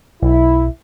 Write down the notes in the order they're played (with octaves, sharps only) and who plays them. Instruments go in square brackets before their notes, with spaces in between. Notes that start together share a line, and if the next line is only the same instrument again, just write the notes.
[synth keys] B1 [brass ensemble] E4